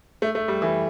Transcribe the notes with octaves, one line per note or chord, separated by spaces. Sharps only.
A3
A3
G3
E3